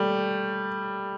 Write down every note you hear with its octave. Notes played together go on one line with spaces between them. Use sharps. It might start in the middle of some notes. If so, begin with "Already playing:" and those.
Already playing: G3 A3